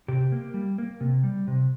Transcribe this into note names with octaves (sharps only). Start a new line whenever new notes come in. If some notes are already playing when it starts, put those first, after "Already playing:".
C3 G4
A#3
G3
A#3
C3
G3
C3